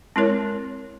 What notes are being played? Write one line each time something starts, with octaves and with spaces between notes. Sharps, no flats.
G#3 C4 E4 A#4 C#5